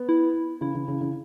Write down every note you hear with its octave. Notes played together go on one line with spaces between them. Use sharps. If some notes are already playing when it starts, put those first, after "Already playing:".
Already playing: B3
E4
C#3 E4
C#3
C#3
C#3